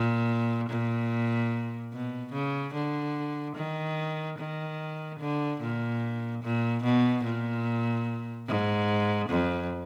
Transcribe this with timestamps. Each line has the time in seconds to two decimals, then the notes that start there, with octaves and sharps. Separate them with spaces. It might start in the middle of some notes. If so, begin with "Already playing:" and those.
Already playing: A#2
0.69 A#2
1.92 B2
2.33 C#3
2.74 D3
3.56 D#3
4.38 D#3
5.20 D3
5.61 A#2
6.43 A#2
6.83 B2
7.24 A#2
8.48 G#2
9.29 F2